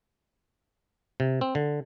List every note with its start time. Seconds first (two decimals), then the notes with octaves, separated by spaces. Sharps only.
1.20 C3
1.41 C4
1.55 D3